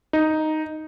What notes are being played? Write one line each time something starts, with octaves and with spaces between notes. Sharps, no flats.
D#4